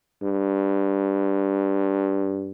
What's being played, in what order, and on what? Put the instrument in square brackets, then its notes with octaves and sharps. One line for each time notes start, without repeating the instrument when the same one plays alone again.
[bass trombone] G2